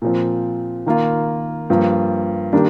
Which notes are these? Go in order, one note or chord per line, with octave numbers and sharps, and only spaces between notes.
A#2 F3 C4
D#3 A#3 F4
G2 F3 A#3
D#3 G3 A#3 D4